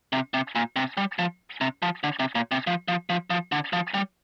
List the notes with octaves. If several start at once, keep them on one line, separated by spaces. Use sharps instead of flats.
C3
C3
A#2
C3
G3
F3
C3
F3
D3
C3
A#2
C3
F3
F3
F3
F3
D3
F3
G3